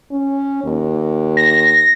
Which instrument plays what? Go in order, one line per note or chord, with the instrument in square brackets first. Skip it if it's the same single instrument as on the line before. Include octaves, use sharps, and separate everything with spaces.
[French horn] C#4
D#2
[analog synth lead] A#6